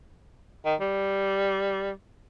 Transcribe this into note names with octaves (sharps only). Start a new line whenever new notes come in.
D#3
G3